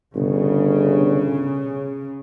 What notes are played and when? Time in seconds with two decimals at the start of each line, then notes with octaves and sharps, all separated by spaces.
0.15 G1 C#3